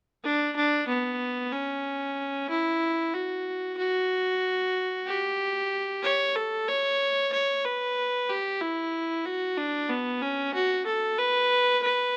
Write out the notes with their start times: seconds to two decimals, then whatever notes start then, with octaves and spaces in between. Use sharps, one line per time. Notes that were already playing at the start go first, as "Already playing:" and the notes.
0.24 D4
0.56 D4
0.88 B3
1.52 C#4
2.49 E4
3.14 F#4
3.77 F#4
5.06 G4
6.03 C#5
6.35 A4
6.68 C#5
7.32 C#5
7.64 B4
8.29 G4
8.61 E4
9.25 F#4
9.57 D4
9.89 B3
10.22 C#4
10.54 F#4
10.86 A4
11.18 B4
11.83 B4